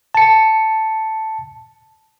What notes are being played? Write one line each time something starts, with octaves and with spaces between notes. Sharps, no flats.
A5 C#7